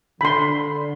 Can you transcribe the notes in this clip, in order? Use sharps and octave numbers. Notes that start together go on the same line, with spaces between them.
D3 B5 C6